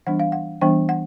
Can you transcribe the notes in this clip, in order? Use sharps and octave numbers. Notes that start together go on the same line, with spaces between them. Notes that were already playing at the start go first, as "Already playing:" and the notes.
E3 G3 B3 D4 F#5
F5
F#5
E3 G3 B3 D4 G5
F#5